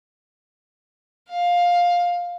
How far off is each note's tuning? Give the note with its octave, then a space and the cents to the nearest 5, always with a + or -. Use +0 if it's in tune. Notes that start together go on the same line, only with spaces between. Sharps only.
F5 +10